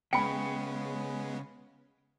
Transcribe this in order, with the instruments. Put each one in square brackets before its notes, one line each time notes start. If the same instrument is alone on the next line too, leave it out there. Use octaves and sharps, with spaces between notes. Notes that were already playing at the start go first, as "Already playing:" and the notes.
[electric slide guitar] C#3 [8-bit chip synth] G#3 B3 [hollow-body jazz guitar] G5 [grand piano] B5 C#7